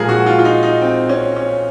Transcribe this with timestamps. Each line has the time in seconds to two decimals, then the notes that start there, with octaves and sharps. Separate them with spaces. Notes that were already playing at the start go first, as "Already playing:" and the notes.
Already playing: A#2 F3 G#3 G#4 A#4
0.09 F#4
0.26 F4
0.39 F4
0.45 D#4
0.63 D#4
0.82 C4
1.09 C#4
1.36 C#4